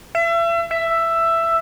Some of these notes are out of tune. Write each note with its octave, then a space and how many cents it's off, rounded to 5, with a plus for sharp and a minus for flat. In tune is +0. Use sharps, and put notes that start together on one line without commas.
E5 +35
E5 +10